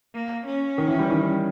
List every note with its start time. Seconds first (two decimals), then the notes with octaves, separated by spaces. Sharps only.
0.14 A#3
0.46 C#4
0.78 D#3
0.88 E3
0.99 G3
1.10 D#3